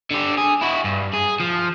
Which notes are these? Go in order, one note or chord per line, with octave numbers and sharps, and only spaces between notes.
D3 G4
G#4
E4 F#4
G2
G#4
F3